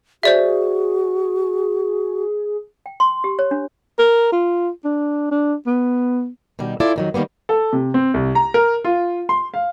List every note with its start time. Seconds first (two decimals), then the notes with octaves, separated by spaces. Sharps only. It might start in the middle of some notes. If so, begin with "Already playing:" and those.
0.23 F#4 G#4 C5 D5 E5
2.86 G5
3.00 C6
3.24 G4
3.39 C#5
3.51 D4
3.99 A#4
4.32 F4
4.84 D4
5.31 D4
5.67 B3
6.59 B2 D#3 G3
6.80 E4 F4 A4 D5
6.96 F2 D#3 F#3
7.14 D#3 E3 G3 A#3 B3
7.49 A4
7.73 C3
7.94 C4
8.14 C2
8.35 A#5
8.54 A#4
8.84 F4
9.29 C6
9.54 F5